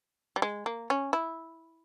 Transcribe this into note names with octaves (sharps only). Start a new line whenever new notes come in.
G3
G#3
A#3
C#4
E4